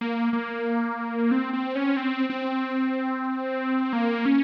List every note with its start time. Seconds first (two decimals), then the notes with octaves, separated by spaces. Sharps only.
0.01 A#3
0.33 A#3
1.31 C4
1.53 C4
1.75 C#4
1.97 C4
2.30 C4
3.93 A#3
4.26 C#4